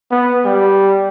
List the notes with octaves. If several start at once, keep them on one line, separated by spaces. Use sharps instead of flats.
B3
G3